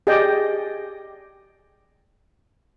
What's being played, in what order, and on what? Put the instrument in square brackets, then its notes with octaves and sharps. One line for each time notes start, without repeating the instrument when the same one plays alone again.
[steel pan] G4 G#4 D5 D#5 G5